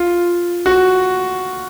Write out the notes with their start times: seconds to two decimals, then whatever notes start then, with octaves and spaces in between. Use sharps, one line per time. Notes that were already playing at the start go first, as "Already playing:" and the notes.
Already playing: F4
0.66 F#4